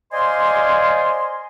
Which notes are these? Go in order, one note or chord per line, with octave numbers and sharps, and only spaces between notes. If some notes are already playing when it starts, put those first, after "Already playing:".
C5 D5 D#5 F5 G#5 C6